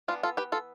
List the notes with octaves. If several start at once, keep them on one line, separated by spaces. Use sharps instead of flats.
E3 B3 D4 F4
F4 A4
G4 B4
F4 A4